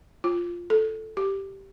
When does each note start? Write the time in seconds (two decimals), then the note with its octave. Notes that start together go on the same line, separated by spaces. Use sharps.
0.24 F4
0.70 A4
1.17 G4